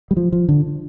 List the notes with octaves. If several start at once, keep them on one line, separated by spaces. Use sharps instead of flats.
G3
F3
F3
D3